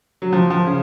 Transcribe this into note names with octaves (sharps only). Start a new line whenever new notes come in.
F#3
F3
F3
C#3